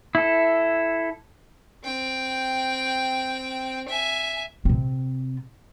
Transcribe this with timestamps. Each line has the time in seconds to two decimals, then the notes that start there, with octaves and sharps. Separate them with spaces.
0.15 E4 A4
1.84 C4 G5
3.88 E5 G#5
4.65 C3 C4